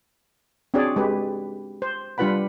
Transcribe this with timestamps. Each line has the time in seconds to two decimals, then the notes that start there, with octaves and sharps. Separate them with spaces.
0.74 C4 D4 F#4 G#4 C#5 D5
0.96 G#3 G4 B4
1.82 C5
2.18 G3 D4 F4 B4 F#5 B5